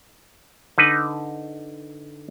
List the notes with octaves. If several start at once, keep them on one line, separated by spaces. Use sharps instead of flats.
D3 D#4 B4